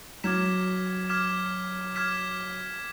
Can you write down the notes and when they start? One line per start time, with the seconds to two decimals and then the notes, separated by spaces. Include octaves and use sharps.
0.24 F#3 D6 F6 G#6 B6 E7
1.09 D6 F6 G#6 B6 E7
1.96 D6 F6 G#6 B6 E7